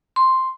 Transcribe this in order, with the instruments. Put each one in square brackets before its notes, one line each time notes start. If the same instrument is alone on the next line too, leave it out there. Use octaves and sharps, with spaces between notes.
[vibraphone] C6